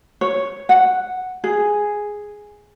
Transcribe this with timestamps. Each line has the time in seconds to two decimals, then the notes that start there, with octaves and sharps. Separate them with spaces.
0.21 C#5
0.69 F#5
1.44 G#4